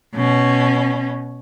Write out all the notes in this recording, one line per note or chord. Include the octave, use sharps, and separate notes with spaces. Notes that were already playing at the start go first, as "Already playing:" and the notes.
B2 C#4